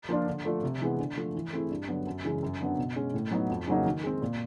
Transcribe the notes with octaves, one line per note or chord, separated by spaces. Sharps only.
F3 A#3 D4 F4
D3
F3 A3 D4
C3
E3 G#3 B3
D3
F3 A3
E3
A3 C4 E4 G#4
G2
D3 F#3 B3
F#2
C#3 E3 G#3
F#2
D3 F#3 B3 D4
B2
G#3 C#4
A2
F#3 B3 D#4
F2
C#3 F#3 A#3 D#4
D#3
G#3 C4
A#2